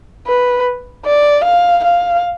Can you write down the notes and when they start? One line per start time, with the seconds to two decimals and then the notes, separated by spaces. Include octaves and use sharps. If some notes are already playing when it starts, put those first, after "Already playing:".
0.27 B4
1.06 D5
1.45 F5
1.84 F5